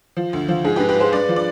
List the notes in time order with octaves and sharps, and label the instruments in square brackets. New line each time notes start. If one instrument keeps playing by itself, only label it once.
[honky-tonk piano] F3
D2
F3
G#2 G#4
G4 B4
G#2
G4 B4
G#3 G#4 C5
G2 B4 D5
F3
D5